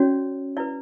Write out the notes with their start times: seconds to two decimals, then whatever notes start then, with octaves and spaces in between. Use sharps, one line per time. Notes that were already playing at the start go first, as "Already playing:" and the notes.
Already playing: C#4 F#4 C#5 D5
0.57 E4 B4 D5